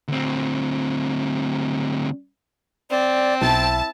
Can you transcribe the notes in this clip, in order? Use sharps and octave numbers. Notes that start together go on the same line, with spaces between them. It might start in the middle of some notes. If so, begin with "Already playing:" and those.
D2 C4
C4 D5
B1 E4 A5